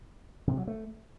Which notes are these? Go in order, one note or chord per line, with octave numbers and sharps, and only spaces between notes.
C3
F#3
A3